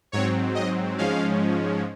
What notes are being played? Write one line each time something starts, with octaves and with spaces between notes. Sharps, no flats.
G#2 F#3 C4 C#5
D#5
G#2 F3 G#3 C#4 F5